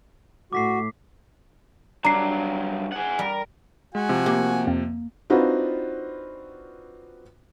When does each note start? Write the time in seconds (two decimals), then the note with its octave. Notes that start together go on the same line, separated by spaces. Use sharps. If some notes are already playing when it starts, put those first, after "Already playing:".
0.53 A2 F#4 D6 B6 C7
2.04 G2 F#3 D4 A#5 C7
2.92 G#4 F#5
3.19 G3 A#4
3.95 G#3 F#4 G#5
4.09 C3 F3
4.26 A#3 G4
4.67 F2
5.30 C4 D4 D#4 F4 F#4 B4